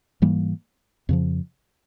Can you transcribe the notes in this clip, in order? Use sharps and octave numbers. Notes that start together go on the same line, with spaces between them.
G#2 E3 G3 A#3
F2 C#3 F3